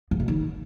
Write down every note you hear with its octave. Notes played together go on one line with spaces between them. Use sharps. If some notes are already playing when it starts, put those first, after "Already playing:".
G#2
B2
D#3